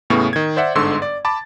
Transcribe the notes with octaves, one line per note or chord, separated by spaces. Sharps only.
E2 A2 C#3 B3 C#6
D#3 G#6
C5 D5 E5 F#5
G1 G#2 D3 C6 C#6 E6
D5
A5 B5 D6 A6